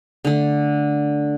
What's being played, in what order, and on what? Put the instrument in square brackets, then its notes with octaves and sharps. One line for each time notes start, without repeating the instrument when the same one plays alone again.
[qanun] D3 A3